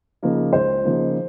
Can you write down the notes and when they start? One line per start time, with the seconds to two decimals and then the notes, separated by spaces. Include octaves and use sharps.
0.23 C#3 F3 A#3 D#4
0.53 C#2 C5
0.85 C#3 F3 A#3 D#4